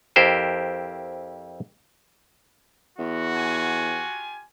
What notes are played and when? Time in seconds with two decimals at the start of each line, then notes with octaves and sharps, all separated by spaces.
0.16 F2 E4 G4 A#4 C5 A5
2.99 E2 F#4
3.35 F4 G4 G#5